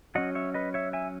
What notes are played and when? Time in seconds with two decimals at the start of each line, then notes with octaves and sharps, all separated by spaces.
0.15 F#3 C#4 D#5 F#5
0.35 C#5 E5
0.54 B4 D#5
0.74 C#5 E5
0.93 E5 G#5